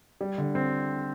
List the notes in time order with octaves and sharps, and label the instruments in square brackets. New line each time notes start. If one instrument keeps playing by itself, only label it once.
[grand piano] G3
D3
C4